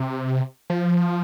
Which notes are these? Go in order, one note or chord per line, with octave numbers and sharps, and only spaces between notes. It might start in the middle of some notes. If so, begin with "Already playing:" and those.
Already playing: C3
F3